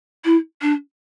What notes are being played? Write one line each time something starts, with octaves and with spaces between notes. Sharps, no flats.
E4
D4